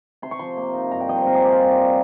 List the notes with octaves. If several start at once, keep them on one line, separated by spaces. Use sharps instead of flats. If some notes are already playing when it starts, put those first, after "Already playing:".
C3 C6
C#6
F3 C6
A#3
D#4
G2 A#5
G5
F3 D#5
C5
C4 A#4
G#4
D#4 G4
F4
G2
G3